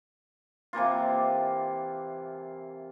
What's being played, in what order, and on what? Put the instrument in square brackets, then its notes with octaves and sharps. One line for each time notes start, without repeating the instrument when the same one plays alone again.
[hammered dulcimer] C3 E3 A#3 F4